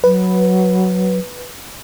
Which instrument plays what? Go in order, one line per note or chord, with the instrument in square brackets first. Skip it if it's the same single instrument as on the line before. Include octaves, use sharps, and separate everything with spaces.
[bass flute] F#3 [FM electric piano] B4